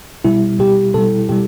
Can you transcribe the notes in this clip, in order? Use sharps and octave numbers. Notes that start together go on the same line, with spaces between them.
B2 G3 E4
B2 G3 G4
B2 G3 A4
B2 G3 G4